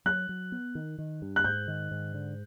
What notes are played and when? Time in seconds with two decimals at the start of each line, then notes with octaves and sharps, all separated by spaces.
0.06 F#3 F#6
0.29 F#3
0.52 B3
0.75 D#3
0.99 D#3
1.22 G2
1.36 F#6
1.44 G#2 G6
1.68 D#3
1.91 G#2
2.14 D3